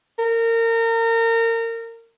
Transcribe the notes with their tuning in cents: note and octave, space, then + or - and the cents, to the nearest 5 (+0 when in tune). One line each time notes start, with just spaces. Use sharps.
A#4 -30